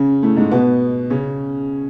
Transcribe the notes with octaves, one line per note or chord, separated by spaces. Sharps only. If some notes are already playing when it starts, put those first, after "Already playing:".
Already playing: C#3 C#4
A2 A3
G#2 G#3
B2 B3
C#3 C#4